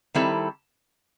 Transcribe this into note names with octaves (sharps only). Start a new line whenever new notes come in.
D#3 G3 C4 E4 A4